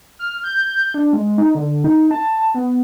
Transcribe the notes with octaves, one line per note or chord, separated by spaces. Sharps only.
F6
G6
D4
G#3
D#4
D3
D#4
A5
B3